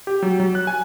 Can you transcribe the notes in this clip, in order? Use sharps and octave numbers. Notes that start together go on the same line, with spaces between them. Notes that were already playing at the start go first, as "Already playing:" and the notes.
G4
F#3
F#3
F#6
G#5